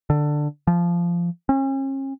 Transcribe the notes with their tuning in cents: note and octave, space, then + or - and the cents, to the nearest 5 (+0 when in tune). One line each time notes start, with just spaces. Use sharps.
D3 +10
F3 -15
C#4 -40